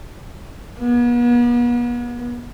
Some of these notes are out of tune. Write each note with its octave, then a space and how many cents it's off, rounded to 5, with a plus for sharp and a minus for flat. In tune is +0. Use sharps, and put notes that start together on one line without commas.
B3 -40